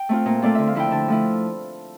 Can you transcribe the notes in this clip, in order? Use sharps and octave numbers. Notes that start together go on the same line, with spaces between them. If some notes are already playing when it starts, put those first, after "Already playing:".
Already playing: G5
A3 C4 F4
A#2
A3 C4 F4 D5
D3 E5
F5
F3 A3 E4 G5
D3 A5
F3 A3 E4